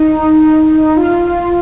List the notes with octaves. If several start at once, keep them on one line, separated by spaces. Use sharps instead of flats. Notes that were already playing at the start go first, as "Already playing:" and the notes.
Already playing: D#4
F4